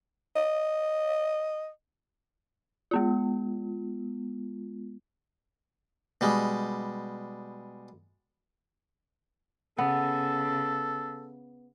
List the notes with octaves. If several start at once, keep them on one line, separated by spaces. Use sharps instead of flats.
D#5
G#3 B3 F4
B2 G3 G#3
C#3 B3 A4